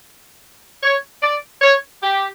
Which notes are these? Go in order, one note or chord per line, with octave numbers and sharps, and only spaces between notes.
C#5
D5
C#5
G4